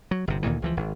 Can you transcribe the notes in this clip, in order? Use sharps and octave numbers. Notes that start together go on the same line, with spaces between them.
F#3
G1 C3
D2 A#2 D#3 E3
C#2 E3 F3
G#1